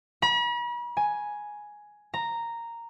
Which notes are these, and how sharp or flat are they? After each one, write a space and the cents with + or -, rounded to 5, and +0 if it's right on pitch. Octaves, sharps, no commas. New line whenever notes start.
B5 -45
G#5 +5
A#5 -5